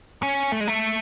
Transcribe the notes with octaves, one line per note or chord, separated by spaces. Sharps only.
C#4
A3
G#3
A3